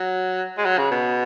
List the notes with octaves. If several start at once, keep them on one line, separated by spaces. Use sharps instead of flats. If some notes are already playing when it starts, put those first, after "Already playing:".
Already playing: F#3
G#3
F#3
C#3
B2